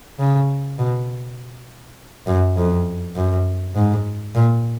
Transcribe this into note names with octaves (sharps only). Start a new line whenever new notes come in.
C#3
B2
F#2
F2
F#2
G#2
A#2